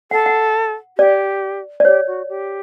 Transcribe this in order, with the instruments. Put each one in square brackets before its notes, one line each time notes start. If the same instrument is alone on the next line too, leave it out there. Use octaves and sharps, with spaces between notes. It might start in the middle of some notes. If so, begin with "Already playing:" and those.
[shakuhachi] A4 [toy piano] F#5
[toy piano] F#5
[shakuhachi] G4 [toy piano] D5
[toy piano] D5
[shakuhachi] G4 [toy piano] C#5
[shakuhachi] F#4
G4